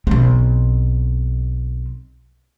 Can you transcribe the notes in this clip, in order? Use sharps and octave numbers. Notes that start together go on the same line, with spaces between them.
B1 C4